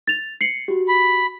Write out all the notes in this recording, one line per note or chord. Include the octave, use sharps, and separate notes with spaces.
A6 F7
C7 C#7 F#7
F#4 G4
B5